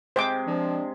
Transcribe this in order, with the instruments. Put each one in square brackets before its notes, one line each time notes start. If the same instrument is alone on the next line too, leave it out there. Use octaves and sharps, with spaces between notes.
[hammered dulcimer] C3 G#3 [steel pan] C5 G5 D6
[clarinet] F3 [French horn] D4